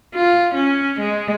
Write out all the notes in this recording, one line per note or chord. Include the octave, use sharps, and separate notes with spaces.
F4
C#4
G#3